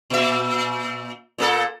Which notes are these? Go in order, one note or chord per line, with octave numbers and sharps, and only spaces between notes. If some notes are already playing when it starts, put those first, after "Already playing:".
A#2 E5
A#2 A#3 A4